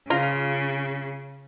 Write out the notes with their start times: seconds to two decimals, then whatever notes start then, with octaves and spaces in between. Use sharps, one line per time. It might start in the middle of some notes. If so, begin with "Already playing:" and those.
0.10 C#3 F4 A#5